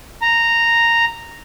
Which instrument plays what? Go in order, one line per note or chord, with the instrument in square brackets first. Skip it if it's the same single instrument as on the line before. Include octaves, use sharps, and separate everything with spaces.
[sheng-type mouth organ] A#5